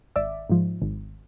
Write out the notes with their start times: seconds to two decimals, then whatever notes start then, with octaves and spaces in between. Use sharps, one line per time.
0.16 G#1 D5 E5
0.49 G#2 F3
0.82 G#1